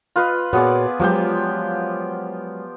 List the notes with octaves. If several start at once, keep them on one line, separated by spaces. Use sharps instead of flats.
F4 B4 D#5
A#2 B3 F#4 G#4 C#5 D5
F3 F#3 G#3 B3 G4 G5